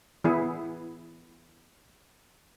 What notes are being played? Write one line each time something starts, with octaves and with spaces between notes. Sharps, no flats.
E3 B3 E4 G#4